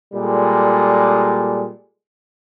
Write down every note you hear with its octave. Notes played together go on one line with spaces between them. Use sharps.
A#2 G3 G#3 A4